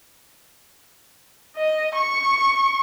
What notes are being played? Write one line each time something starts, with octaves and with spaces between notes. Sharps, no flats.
D#5
C#6